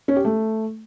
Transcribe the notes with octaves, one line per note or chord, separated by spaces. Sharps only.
C#4
G4
A3